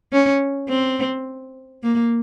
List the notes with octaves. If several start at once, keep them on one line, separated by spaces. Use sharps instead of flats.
C#4
C4
A#3